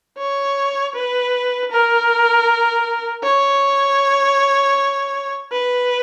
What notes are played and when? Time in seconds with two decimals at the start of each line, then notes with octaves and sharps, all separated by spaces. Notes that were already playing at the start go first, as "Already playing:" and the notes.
0.18 C#5
0.95 B4
1.71 A#4
3.23 C#5
5.51 B4